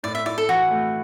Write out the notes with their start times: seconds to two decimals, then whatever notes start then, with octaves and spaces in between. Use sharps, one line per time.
0.04 A2 D5
0.15 E5
0.26 E4 D5
0.38 A4
0.49 E3 F#4
0.71 A3